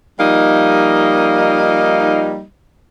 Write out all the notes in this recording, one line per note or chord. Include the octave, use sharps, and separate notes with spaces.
F3 G3 A#3 D#4